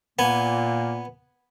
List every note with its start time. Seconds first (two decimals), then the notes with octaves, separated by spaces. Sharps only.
0.19 A#2 A#3 B3 G#5